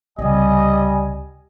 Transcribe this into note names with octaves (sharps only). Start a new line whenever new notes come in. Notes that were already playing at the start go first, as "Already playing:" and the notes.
C#2 C3 G3 D#5 G#5